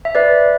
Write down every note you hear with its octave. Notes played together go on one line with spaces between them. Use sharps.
E5
B4 D5